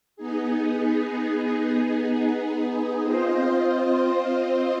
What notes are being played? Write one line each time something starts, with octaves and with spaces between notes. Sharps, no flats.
B3 D#4 G#4
C4 F4 C5 D#5